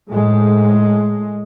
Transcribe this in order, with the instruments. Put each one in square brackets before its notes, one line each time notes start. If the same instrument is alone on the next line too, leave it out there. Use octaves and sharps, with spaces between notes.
[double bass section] A2 G#3